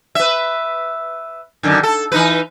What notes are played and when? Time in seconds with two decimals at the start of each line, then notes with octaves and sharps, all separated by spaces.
0.15 B4 E5
1.63 F#2 D3 D#3
1.83 A4
2.12 E3 D#4 B4